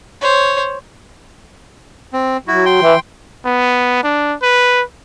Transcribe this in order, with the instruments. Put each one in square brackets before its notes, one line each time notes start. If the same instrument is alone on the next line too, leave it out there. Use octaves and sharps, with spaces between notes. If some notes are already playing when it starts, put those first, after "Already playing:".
[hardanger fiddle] C5 C#5
[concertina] C4
[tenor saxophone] F#3 [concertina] E4 F#4
[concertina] G5 C6
[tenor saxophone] E3
[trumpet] B3
D4
B4